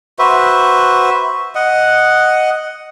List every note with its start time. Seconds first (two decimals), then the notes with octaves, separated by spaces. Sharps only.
0.19 F#4 B4 C5 E5
1.55 D#5 F#5